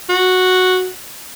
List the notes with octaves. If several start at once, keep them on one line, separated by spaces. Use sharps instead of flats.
F#4